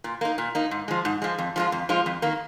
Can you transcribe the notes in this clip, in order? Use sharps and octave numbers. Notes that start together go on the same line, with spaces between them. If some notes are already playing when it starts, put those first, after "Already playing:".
A#2
A#3 D#4
A#2
A#3 D#4
G#2
F3 G#3
G#2
F3 G#3
F2
F3 G#3 F4
F2
F3 G#3 F4
F2
D#3 A#3